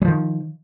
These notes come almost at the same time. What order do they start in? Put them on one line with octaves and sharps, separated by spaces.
G3 F3 D#3